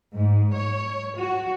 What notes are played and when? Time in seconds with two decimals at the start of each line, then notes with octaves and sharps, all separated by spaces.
0.17 G#2
0.54 C#5
1.19 F#4